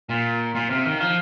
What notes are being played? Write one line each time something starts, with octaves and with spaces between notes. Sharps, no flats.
A#2 F4
A#2 F4
C3 F5
D#3 F5
F3 F5